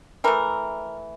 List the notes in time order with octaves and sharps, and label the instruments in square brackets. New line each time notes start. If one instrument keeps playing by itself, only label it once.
[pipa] E3 A3 A#4